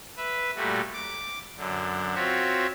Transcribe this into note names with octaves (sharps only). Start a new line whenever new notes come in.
B4 E5
A#2 G3 A3 F#4
D6
F#2 D3
C4 F4 F#4 C#5 E5